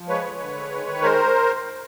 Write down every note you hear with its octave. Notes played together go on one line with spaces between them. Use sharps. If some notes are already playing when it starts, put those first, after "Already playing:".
Already playing: F3
G#3 B4 C#5
D3
D3
G#3
D#3
D#3
G#3 A#4 C5